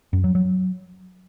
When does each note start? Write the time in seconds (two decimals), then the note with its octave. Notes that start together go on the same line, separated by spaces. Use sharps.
0.13 F#2
0.24 F#3
0.35 F#3